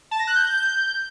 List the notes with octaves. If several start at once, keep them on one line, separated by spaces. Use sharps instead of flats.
A5
A#6
F#6
G6